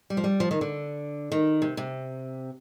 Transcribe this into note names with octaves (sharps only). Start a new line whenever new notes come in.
G3
F3
G3
F3
D#3
D3
D#3
C3
C3